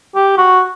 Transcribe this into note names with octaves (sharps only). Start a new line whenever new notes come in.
G4
F#4